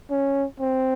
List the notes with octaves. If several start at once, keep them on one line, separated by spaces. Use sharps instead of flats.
C#4
C4